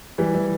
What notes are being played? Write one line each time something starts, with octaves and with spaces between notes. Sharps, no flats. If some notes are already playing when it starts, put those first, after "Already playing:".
E3 G3
E3